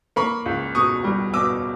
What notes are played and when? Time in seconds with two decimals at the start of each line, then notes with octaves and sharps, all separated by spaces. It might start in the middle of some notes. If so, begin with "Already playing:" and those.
0.16 A#3 B5 C#6
0.46 C#2
0.75 B2 C#6 D#6
1.04 G3
1.34 B2 D6 E6